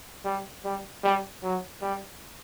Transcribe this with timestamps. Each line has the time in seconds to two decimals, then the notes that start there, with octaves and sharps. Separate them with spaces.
0.25 G3
0.64 G3
1.04 G3
1.43 F#3
1.82 G3